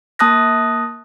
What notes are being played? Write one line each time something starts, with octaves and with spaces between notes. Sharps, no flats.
A#3 A5 D#6 F#6 A#6